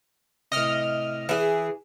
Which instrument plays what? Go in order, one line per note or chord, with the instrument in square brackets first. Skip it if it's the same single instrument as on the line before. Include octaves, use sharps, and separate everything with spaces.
[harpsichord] A2 C3 [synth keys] D#5 F6
[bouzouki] E3 G#4 [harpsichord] E4